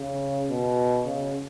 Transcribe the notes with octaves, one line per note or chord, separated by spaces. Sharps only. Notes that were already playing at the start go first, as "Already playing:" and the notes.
Already playing: C#3
B2
C#3